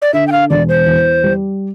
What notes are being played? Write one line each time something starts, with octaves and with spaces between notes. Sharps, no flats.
D5
D3 E5
G5
F5
E1 D5
C5
E2
G3